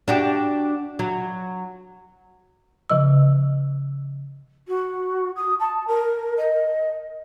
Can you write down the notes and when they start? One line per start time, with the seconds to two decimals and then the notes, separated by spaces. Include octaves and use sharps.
0.08 D4 F#4 G4
0.99 F#3
2.90 C#3 F3 D#5 E6
4.68 F#4
5.36 D#6
5.60 A5
5.87 A#4
6.37 D#5